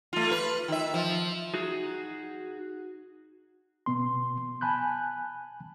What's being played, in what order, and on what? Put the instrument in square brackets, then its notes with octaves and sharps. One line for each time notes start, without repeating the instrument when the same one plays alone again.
[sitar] A3 F4
B4
D#3 E5
F3
[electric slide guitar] D#4 F#4 G#4
[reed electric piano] B2 B3 C6
G#5 A5 B5 F#6 G6